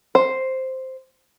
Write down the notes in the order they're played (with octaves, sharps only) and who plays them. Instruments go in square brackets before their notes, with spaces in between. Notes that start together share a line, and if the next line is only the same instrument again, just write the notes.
[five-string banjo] C5